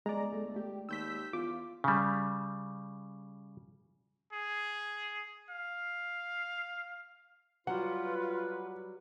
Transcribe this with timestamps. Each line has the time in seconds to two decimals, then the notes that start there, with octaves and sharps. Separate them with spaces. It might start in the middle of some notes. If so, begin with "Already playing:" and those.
0.06 G1 G#3 D5 A#5
0.33 A3
0.55 A3 G4
0.89 D#2 E6 G6 B6
1.33 E2 F4 D6
1.84 C#3 G3
4.33 G#4
5.50 F5
7.67 F#3 G3 F4 B4 F#5